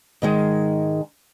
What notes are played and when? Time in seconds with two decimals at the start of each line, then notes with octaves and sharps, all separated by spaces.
0.22 G#2 D#3 G#3